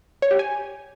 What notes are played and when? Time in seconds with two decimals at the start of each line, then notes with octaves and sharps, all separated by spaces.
0.22 C#5
0.31 G4
0.39 G#5